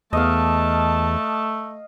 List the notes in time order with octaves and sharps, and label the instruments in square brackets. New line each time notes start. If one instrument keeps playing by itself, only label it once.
[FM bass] E2 [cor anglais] A3 [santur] D#5 F5 [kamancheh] A5